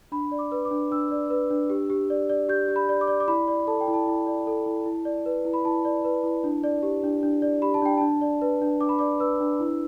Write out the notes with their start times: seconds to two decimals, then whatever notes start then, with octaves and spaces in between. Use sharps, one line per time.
0.12 D4 B5
0.32 D5
0.39 D6
0.52 B4
0.65 D6
0.71 D4
0.91 D4 E6
1.11 D5
1.30 B4
1.50 D4
1.70 G4
1.90 G4
2.10 D5
2.30 D5
2.49 G4 G6
2.68 G4
2.76 B5
2.89 D5
3.01 D6
3.08 D5
3.20 D6
3.28 E4 B5
3.48 D5
3.67 A4 A5
3.81 G5
3.88 E4
3.94 A5
4.07 E4
4.27 D5
4.47 A4
4.66 E4
4.86 E4
5.05 D5
5.26 B4
5.45 E4
5.54 B5
5.65 E4 A5
5.85 D5
6.05 B4
6.24 E4
6.44 D4
6.64 D5
6.83 G4
7.04 D4
7.23 D4
7.42 D5
7.62 G4 B5
7.74 A5
7.82 D4 G5
7.98 D4 A5
8.21 D5
8.42 B4
8.61 D4
8.80 D4 D6
8.89 B5
8.99 D5 D6
9.20 B4 E6
9.40 D4
9.60 E4